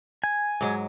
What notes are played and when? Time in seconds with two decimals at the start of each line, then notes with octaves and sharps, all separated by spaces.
0.24 G#5
0.61 G#2 F#3 G#3